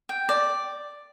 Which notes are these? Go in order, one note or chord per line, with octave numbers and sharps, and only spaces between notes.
G5
D5